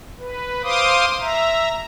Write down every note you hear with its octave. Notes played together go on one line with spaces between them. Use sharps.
B4
C5 F5 C6 D6 D#6
E5 A#5